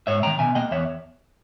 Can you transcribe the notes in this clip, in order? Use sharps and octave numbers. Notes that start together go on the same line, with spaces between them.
G#2 C#5 E5
D#3 A#3 G5 A#5
B2 E5 G#5
A#3 D#5 G5
E2 C#5 E5